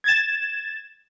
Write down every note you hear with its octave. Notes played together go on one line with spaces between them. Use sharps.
G#6 A6 E7